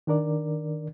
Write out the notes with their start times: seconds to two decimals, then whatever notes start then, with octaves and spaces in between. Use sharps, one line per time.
0.07 D#3 D4 A#4 D5